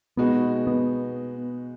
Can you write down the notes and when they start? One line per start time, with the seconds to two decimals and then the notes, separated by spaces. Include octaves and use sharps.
0.17 B2 G#3 B3 D#4 F#4
0.67 B3